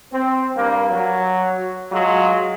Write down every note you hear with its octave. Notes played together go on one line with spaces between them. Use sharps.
C4
G2 A#3
F#3
F#3 G#3 F4